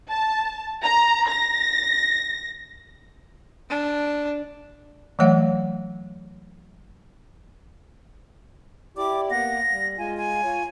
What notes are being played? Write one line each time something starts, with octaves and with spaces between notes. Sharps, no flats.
A5
A#5
A#6
D4
E3 F#3 A3 C#5 F5 F#5
E4 G4 D5 D6
A#3 B3 F#5 A#6
G3
G#3 F4 G#5
G#5
F4 C#5